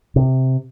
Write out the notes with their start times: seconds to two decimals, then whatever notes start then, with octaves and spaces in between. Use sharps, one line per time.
0.16 C3